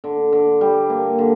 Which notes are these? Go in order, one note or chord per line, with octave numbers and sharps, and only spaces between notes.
D3
D3
G3
A#3
D3